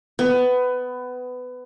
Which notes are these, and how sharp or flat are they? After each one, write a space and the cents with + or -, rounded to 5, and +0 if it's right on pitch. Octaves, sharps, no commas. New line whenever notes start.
B3 +20